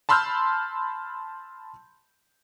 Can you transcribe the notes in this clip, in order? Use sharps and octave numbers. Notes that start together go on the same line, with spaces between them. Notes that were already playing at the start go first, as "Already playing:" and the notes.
A5 B5 C6 E6 F6 G6